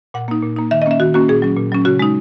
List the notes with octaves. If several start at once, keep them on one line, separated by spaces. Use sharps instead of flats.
A#2 F#5
A#3 D#4
A#2
A#3 D#4
D#3 E5
D#5
A#3 C#4 E5
D#3 F#4
A#3 C#4 F#4
A#2 G#4
F#3 C#4
A#2
F#3 C#4
C#3 F#4
G#3 D#4